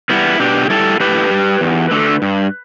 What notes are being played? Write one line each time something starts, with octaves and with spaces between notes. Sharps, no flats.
G3 B3 E4
B2 D4 G4
G3 E4 A4
A2 G4 B4
G3
E2
D3 A3
G2